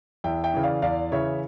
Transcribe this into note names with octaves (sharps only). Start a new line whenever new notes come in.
E2 E5 G5
E5 G5
C#3 E3
D5 F5
E2 D5 F5
C#3 E3 C#5 E5